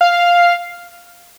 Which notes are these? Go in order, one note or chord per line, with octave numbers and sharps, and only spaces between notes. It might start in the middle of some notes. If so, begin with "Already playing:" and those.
F5